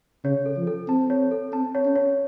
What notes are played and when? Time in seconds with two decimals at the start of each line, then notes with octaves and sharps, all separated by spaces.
0.24 C#3 C#5
0.46 A4
0.57 F3
0.67 A4
0.88 C4 A5
1.10 C#5
1.31 A4
1.53 C4 A5
1.75 C#5
1.85 C#4
1.96 C#5